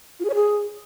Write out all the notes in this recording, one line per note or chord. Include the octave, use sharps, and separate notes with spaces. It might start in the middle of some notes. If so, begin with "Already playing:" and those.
F4
G#4
C#5
G#4